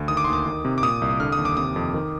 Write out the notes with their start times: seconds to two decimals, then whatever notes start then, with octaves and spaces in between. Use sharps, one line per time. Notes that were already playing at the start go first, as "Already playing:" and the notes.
Already playing: D2
0.08 D#3 D#6
0.17 D6
0.24 D#2 C6
0.33 D6
0.46 D#3
0.65 C3
0.78 D6
0.83 A#2 D#6
1.02 C2
1.20 D3 F6
1.32 D#6
1.38 D#2
1.45 D6
1.57 C3 D#6
1.76 F2
1.94 D#3